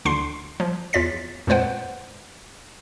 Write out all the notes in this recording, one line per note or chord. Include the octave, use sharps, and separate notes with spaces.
D2 D3 D4 C6 C7
F3
E2 F4 C#5 A6 B6
F2 A#2 G#3 B4 C5 F#5